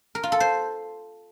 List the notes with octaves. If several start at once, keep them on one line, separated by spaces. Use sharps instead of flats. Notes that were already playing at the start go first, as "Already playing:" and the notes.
A#4
F4
A4
C5